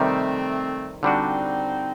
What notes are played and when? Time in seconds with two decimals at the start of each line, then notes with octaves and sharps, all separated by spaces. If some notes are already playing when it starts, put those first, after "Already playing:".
Already playing: C3 D#3 G3 A3 C4
1.03 D3 G3 C4 D4 D#4 F#4